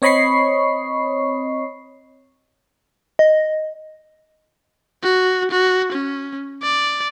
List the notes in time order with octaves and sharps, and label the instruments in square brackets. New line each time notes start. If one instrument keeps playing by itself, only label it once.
[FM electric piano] C4 C#5 D#5 B5 C#6 C7
[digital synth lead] D#5
[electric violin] F#4
F#4
C#4
D5